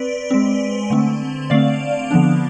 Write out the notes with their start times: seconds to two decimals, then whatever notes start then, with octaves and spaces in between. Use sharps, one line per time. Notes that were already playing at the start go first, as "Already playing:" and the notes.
Already playing: C4 B4 D5
0.31 G#3 C4
0.90 D3 A3 C4
1.50 D3 A3 C4 D5 F5
2.11 D3 F3 B3 D4